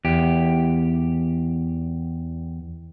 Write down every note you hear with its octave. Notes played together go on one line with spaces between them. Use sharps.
E2 G4